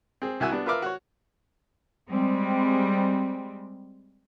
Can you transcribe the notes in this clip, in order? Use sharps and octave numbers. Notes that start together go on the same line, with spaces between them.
C4 G#4
C2 E4 F#4 G#5 E6
G3 B3 D4
F4 A#4 B4 E5 D6 F6
F#4 C#5
G3 G#3 C4